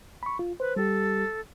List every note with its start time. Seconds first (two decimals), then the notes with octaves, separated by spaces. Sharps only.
0.23 B5 C#6
0.39 F4
0.60 B4 C5
0.76 G3 G4 A4